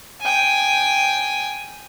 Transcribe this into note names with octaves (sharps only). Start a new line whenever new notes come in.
G5 G#5